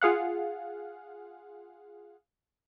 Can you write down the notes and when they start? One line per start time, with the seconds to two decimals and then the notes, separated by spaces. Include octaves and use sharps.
0.01 F4 G#4 F5 F#5